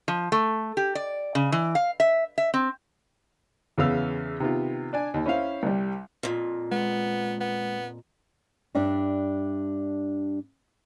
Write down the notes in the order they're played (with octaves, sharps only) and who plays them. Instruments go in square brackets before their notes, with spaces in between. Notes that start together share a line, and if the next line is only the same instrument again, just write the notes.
[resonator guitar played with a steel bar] F3
A3
G4
D5
C#3
E3
F5
E5
E5
C4
[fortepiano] E2 C#3 B3 F5 E6
C3 D#3 B3 F4
D4 D5 G#5
D#2
C#4 E4 C5 E5 F5
C2 G3
[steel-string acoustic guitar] F2 A#2
[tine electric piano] G#3 [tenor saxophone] B3
[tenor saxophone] B3
[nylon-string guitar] G2 G3 D4 E5